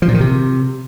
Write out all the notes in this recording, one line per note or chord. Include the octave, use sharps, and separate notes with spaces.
F3
A#2
D#3
C3